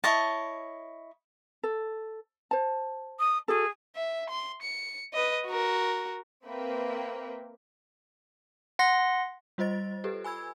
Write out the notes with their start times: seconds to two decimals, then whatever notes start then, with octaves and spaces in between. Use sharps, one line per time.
0.04 E4 C#5 D#5 A5
1.63 A4
2.51 C5 A5
3.19 D#6
3.48 F#4 G#4 A4
3.96 E5
4.30 C6
4.62 C#7
5.13 B4 D#5
5.47 F#4 A#4
6.45 A#3 C4 B4 E5 G5
8.79 F#5 C6 A#6
9.58 G3 F4 C5 D#5 A6
10.04 G4 A4 B4
10.24 G#5 B5 E6 G#6